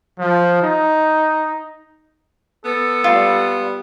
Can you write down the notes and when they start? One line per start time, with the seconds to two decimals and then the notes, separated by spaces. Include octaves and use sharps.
0.19 F3
0.63 D#4
2.65 B3 A4
3.04 G3 F4